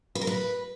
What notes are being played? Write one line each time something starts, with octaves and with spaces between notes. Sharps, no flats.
B4
A#4
B4